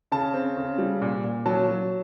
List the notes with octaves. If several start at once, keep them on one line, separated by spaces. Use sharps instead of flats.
C#3 A5
C4
C#3
G3
A#2
A#2
F#3 A5
F#3